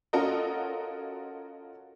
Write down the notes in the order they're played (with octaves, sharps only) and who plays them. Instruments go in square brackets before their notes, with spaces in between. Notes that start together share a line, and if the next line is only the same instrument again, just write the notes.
[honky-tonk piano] C#4 F4 F#4 A4 A#4 D#5